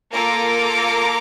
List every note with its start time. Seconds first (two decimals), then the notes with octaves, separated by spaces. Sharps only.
0.13 A#3 F4 A4 A#5 D6